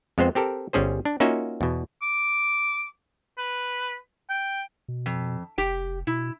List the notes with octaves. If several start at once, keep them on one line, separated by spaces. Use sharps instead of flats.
F2 G#3 B3 C4 C5
C4 G4 A4 A#4
G1 G3 C#4 G#4 C5
D4
A#3 C#4 D#4 F4 F#4 E5
E2 B2
D6
B4
G5
B2
F2
F1 G4 G5
B2 E4